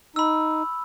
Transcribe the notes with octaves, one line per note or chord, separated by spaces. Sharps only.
D#4 B5 E6